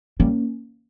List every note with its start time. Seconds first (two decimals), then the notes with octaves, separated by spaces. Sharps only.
0.19 G3 A#3 C#4